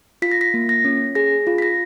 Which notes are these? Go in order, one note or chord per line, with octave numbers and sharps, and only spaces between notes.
F4 B6
A#6
B6
A#3
A#6
C#4
G#4 A#6
F4
B6
A#6